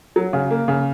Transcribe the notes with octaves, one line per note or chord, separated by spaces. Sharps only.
F#3
C#3
A#3
C#3